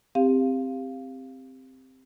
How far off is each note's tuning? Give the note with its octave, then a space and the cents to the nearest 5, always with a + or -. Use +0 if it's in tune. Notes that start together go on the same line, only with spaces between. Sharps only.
C4 +0 G4 +20 F5 +0